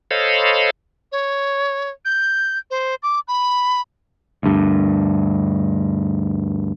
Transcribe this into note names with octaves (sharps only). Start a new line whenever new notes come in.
A4 C5 C#5 D#5 F5 B5
C#5
G6
C5
D6
B5
D2 G2